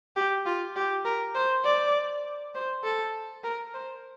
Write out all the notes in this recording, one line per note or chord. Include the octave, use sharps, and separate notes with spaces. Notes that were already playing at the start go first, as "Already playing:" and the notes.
G4
F4
G4
A#4
C5
D5
C5
A4
A#4
C5